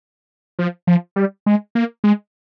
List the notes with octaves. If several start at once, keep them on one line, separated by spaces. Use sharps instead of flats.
F3
F3
G3
G#3
A#3
G#3